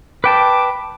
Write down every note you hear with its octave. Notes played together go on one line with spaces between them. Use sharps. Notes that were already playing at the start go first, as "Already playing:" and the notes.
B4 G5 A5 D6